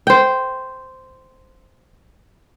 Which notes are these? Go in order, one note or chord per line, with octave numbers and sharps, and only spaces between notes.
C5 G5